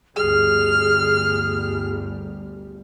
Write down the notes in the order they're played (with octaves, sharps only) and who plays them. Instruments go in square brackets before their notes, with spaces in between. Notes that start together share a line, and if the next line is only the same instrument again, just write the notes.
[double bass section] G1 D2 G3 [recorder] G#4 [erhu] F6